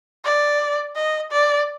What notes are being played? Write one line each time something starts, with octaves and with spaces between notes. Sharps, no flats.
D5
D#5
D5